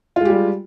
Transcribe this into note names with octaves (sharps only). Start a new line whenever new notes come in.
G3 G#3 F4 G4